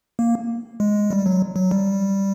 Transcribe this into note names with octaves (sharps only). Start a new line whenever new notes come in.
A#3
G#3
G3
F#3
F#3
G3